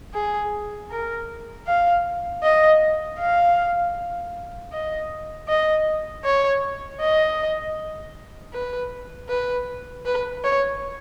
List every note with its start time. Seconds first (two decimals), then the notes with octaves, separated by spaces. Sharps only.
0.14 G#4
0.91 A#4
1.67 F5
2.44 D#5
3.19 F5
4.72 D#5
5.48 D#5
6.24 C#5
7.01 D#5
8.53 B4
9.30 B4
10.05 B4
10.44 C#5